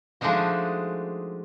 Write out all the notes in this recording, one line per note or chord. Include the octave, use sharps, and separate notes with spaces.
F3 G#3 A3 D4 D#4 F#4